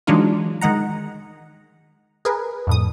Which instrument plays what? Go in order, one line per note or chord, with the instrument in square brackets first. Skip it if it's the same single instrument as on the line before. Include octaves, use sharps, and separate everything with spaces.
[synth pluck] E3 F#3 G#3 D4 D#4 F4
D#3 G#3 D#5 F#5 A#5
G#4 A#4 B4
F2 A2 D#6